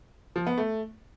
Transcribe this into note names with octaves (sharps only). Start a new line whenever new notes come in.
F3
B3
A3